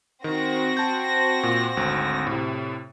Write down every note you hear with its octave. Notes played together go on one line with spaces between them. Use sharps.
D#3 C4 F#4 A#6
A5 G6
A#2
G#1 D2
A2 C3